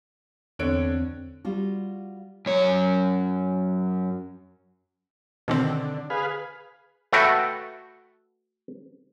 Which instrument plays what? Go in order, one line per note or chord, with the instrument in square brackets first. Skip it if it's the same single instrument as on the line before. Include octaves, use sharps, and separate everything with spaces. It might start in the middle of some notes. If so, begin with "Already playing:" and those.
[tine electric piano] E2 C4 [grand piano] D3 C#5 D7
[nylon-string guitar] G3 F4 F#4
[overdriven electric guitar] F#2 C#5
[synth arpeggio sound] B2 D#3 C4 [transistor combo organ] D3
[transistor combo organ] G#4 B4 F5
[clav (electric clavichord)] A3 F#4 A4 B4 G5